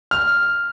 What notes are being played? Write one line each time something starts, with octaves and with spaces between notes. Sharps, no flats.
F6